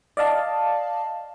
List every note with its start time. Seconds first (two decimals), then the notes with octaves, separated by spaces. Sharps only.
0.17 D5 D#5 F5 A5